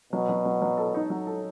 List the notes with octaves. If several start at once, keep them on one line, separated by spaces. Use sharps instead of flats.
B2 F#3
F#3
F#3
F#3
A4
D#4
F#3
A4